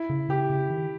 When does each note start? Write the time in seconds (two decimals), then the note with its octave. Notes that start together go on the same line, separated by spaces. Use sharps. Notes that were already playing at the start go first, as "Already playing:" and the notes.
Already playing: E4
0.10 C#3
0.29 C#3 G4
0.50 C#3
0.70 D#3